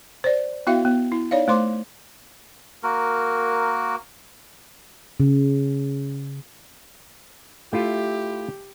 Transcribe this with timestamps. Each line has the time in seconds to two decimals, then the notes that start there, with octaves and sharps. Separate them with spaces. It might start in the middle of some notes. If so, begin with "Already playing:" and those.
0.24 C5 D5
0.67 B3 E4 F#4 E5 F5 G5
0.85 B3
1.12 E4
1.31 D#4 C#5 D5 F5
1.48 A3 C5 C6 D6
2.83 A#3 F#4 A#4
5.20 C#3
7.73 A3 E4 F4 G4